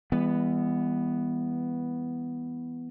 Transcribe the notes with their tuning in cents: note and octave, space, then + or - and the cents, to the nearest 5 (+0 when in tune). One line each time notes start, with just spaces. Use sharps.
E3 +0 G3 +45 B3 +0